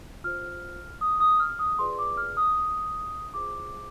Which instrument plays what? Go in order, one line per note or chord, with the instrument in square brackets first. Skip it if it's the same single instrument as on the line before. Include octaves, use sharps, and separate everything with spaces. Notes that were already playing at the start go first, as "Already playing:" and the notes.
[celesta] F4 C5 F6
D#6
D#6
F6
D#6
F4 G#4 B4 D5 C6
D6
F6
D#6
F4 G#4 C5 D6